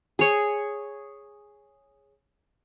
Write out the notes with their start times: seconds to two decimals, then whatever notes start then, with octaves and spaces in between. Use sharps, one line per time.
0.19 G#4 C#5